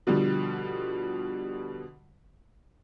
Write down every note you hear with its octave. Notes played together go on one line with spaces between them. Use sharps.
B2 D3 F3 G3